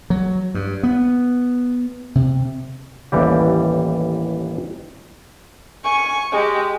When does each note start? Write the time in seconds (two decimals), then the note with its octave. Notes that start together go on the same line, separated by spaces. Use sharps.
0.10 F#3
0.54 G2
0.83 B3
2.15 C3
3.12 A1 D#2 E3 G3 G4
5.84 G#5 C#6
6.32 G#3 G4